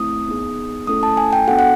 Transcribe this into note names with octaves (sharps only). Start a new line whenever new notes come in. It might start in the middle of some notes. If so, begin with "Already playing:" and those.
Already playing: A3 C4 E4 D#6
B3 D#4 G#4
A3 C#4 E4 A4 D#6
A5
G#5
G5
B3 D4 F#4 A4 F#5
F#5